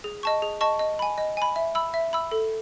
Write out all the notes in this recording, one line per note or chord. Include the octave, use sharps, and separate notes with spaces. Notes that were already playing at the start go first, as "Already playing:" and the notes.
G#4
D#5 A5 C#6
G#4
D#5 A5 C#6
D#5
G#5 B5
D#5
G#5 B5
E5
B5 E6
E5
B5 E6
A4